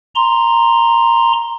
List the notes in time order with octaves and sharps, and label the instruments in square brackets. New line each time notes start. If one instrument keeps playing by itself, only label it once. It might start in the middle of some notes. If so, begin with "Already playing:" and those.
[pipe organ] A#5 C6